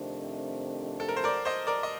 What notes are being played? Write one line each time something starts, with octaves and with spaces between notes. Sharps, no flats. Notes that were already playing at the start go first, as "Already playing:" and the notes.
Already playing: F2 C3 D#3 A3 D4
A4
A#4
C5
A#4 D5
C5 D#5
A#4 D5
D#5